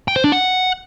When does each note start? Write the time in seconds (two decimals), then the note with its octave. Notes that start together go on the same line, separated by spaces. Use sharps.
0.08 G5
0.16 C5
0.24 D4
0.32 F#5